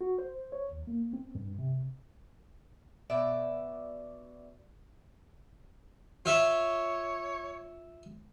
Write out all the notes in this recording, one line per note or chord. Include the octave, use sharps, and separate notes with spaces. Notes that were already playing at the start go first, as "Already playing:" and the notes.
F#4
C5
C#5
D#2
A#3
C4
G2
C3
B2 D5 E5
F4 C#5 E5